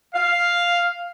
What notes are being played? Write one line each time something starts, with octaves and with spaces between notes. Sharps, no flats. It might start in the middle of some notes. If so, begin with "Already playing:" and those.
F5